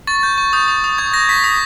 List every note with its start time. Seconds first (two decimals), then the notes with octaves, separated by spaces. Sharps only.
0.07 C#6 A6
0.23 G6
0.38 C#6
0.53 D#6 G6
0.68 D#6
0.84 D#6
0.98 C#6 G#6
1.14 G6 A#6
1.29 C#6 B6
1.44 D#6 B6